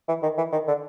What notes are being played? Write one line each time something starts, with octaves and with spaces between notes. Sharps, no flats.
E3
D#3
E3
D#3
D3